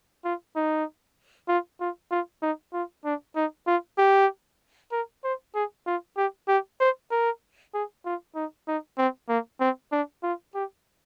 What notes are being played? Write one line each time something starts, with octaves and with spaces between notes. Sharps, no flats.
F4
D#4
F4
F4
F4
D#4
F4
D4
D#4
F4
G4
A#4
C5
G#4
F4
G4
G4
C5
A#4
G#4
F4
D#4
D#4
C4
A#3
C4
D4
F4
G4